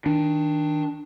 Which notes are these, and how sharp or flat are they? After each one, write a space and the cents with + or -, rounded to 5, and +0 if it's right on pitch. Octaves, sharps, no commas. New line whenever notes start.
D#3 +25 D4 +15